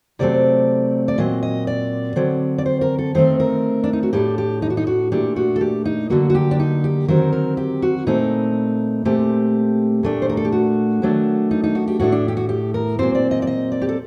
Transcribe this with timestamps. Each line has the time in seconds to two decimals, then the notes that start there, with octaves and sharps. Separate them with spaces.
0.19 C3 F#3 A3 C4 D5
1.08 D5
1.18 A#2 F#3 C4 D#5
1.43 D#5
1.67 D5
2.16 D3 F#3 C4
2.58 D5
2.66 C5
2.81 A#4
2.99 A4
3.15 D#3 A3 C4 C5
3.40 A#4
3.84 D4
3.93 D#4
4.03 F#4
4.13 A2 A3 D4 G4
4.38 G4
4.62 D#4
4.70 F#4
4.77 D#4
4.87 F#4
5.12 A#2 A3 D4 G4
5.36 F#4
5.56 A4
5.61 G4
5.85 D#4
6.10 D3 F#3 A#3 F#4
6.30 F#4
6.35 G4
6.51 D4
6.60 D#4
6.84 G4
7.08 D#3 F#3 C4 A#4
7.33 A#4
7.57 G4
7.82 F#4
8.07 A#2 A3 C4 D#4
9.05 A#2 A3 C4 G4
10.03 A#2 A3 D4
10.22 C5
10.29 A#4
10.37 A4
10.45 G4
10.52 F#4
11.02 D#3 F#3 A3 D4
11.51 D#4
11.64 D#4
11.75 F#4
11.88 G4
11.99 A2 A3 D4 F#4
12.12 D4
12.28 G4
12.37 F#4
12.49 G4
12.74 A#4
12.99 A#2 F#3 C4 C5
13.15 D5
13.31 D#5
13.42 D5
13.47 D#5
13.72 D5
13.82 G4
13.89 A4